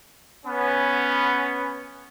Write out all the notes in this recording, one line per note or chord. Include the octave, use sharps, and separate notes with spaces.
B3 C#4